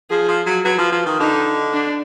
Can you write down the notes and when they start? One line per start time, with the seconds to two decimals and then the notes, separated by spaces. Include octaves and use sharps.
0.10 F3 G#4
0.28 F3
0.46 F#3
0.64 F#3 B4
0.78 F3
0.92 F3
1.06 D#3
1.19 D3 D#4
1.74 D4